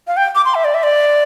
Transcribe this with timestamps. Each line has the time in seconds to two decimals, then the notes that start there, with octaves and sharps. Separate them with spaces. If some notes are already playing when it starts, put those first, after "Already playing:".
0.07 F5
0.17 G5
0.35 D6
0.45 C6
0.55 E5
0.64 D5
0.74 E5
0.83 D5